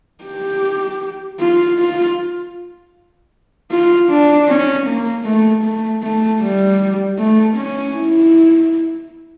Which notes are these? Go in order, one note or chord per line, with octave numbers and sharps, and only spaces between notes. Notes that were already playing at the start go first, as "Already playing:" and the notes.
G4
F4
F4
F4
D4
C#4
A#3
A3
A3
A3
G3
A3
C#4
E4